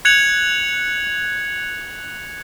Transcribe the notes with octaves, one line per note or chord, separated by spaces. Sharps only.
F#6 G#6 C#7 F7 F#7